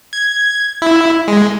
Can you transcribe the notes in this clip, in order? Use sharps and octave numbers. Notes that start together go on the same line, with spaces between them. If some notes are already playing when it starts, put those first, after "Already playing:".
G#6
E4
G#3